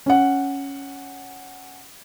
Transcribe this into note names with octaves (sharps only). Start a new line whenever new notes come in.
C#4 F#5